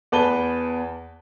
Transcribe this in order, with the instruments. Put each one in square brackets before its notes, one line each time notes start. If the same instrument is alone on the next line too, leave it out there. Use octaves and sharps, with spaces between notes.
[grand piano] E2 B4 A5 G7